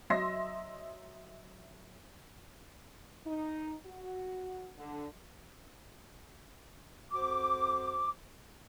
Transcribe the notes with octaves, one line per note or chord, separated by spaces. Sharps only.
F#3 D#5 E5 C6 A#6
D#4
F#4
D3
F2 F#4 C5 D6